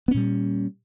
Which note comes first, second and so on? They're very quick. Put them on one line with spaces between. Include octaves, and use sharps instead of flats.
B3 C#4 A#2 G3